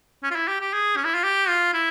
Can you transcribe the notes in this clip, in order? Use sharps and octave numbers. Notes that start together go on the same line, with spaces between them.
C#4
F4
E4
G4
G4
G#4
C#4
E4
F4
G4
F4
E4